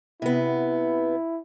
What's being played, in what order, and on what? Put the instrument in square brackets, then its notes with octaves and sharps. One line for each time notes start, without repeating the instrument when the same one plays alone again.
[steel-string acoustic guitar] C3 B3 [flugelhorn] E4